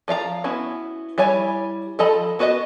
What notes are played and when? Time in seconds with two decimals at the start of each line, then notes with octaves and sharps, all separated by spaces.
0.08 F3 D5 F5 A#5
0.44 B3 C#4 E4 F#4
1.18 G3 E4 C#5 G#5
1.99 F3 A4 D#5 A#5 B5
2.39 B3 F#4 B4 D5 D#5